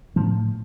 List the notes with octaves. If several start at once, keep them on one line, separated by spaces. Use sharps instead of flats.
A2 F3